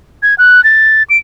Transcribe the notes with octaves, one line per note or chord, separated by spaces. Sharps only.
G#6
F#6
A6
D7